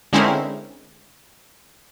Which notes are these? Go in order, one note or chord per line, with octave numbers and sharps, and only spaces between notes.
D3 G#3 C4 C#4 E4 A#4